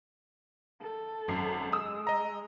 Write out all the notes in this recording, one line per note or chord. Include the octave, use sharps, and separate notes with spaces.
A4
G#1 F#2 C7
G#3 D#6 E6
D#5 A#5